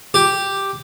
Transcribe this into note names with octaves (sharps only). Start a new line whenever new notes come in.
G4